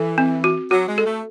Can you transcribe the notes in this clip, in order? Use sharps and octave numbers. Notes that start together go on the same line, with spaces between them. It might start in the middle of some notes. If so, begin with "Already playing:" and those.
Already playing: E3 A4
C4
F#4
F#3 F#4
G#3
A4
A3